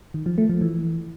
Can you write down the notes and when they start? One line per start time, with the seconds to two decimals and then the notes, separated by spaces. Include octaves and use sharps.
0.14 D#3
0.26 F3
0.38 A3
0.49 F3
0.61 E3